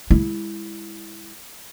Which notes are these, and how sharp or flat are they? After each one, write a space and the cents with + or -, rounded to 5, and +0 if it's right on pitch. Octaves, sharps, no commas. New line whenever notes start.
G#3 -35 E4 +0